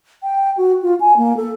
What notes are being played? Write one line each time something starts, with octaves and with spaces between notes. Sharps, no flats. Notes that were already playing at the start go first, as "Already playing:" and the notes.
G5
F#4
F4
G#5
A#3
A4